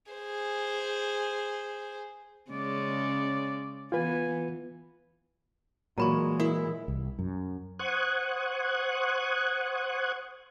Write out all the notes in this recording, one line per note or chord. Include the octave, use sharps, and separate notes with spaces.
G#4 C5
C#3 G#3 C#4 D5
E3 B3 F4 B4 G#5
A#2 E3 F#3 G#3 A#3 A#5 B5 C#6
E4 A#4
C2
F#2
C5 F#5 C#6 D#6 F#6 G#6